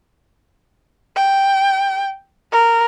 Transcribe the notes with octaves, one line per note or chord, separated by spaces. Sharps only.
G5
A#4